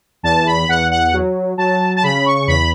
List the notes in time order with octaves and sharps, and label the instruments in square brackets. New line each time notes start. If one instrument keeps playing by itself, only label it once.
[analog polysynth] E2 A5
B5
E2 F#5
F#5
F#3
F#3 A5
A5
C#3 B5
C#6
E2 B5